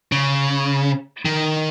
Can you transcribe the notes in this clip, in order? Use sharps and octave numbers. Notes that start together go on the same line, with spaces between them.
C#3
D#3